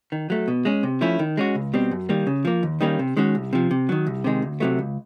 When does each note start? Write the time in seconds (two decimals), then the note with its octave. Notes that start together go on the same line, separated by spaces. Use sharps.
0.12 D#3
0.30 F#3 A3
0.48 B2
0.65 G#3 C#4
0.83 C3
1.01 F3 A3 C#4 E4
1.19 D#3
1.37 G#3 C#4 F#4
1.55 C#2
1.74 B2 G3 C4
1.91 F#2
2.09 D#3 G3 A#3
2.27 C#3
2.45 F3 A#3
2.63 D#2
2.81 D#3 G3 A#3 C#4
2.99 C3
3.17 D#3 G#3 C#4 F#4
3.35 C2
3.53 C3 F3
3.71 C3
3.89 D#3 F#3
4.07 C2
4.24 C3 D#3 G#3
4.42 D2
4.60 C3 D#3 F#3 A3
4.79 C#2